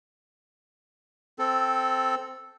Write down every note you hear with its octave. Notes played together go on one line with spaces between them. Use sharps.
C4 A4